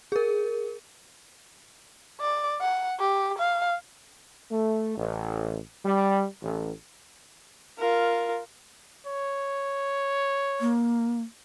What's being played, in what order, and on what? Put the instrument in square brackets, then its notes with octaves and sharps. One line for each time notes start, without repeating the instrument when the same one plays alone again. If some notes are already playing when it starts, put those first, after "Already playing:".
[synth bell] G#4 A#4
[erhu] D5
F#5
G4
F5
[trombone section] A3
A1
G3
A1
[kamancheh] F4 A#4
[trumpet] C#5
[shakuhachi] A#3